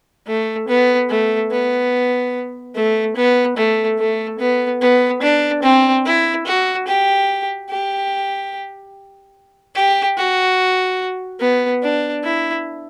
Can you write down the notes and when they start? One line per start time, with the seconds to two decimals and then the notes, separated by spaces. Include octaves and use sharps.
0.27 A3
0.68 B3
1.09 A3
1.51 B3
2.75 A3
3.16 B3
3.57 A3
3.98 A3
4.39 B3
4.81 B3
5.22 D4
5.63 C4
6.05 E4
6.46 F#4
6.87 G4
7.70 G4
9.75 G4
10.17 F#4
11.40 B3
11.82 D4
12.24 E4